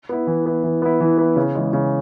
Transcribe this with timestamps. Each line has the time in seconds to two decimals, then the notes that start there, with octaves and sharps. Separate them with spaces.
0.09 B3 E4
0.27 E3
0.46 B3 E4
0.64 E3
0.82 B3 E4
1.00 E3
1.18 B3 E4
1.36 C#3
1.55 E3 G#3
1.73 C#3